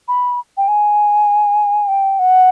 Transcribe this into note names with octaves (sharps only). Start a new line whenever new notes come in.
B5
G5
G#5
G5
F#5